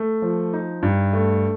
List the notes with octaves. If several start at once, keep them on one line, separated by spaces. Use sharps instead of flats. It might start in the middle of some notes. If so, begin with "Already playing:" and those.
Already playing: A3
F3
D#4
G2
A3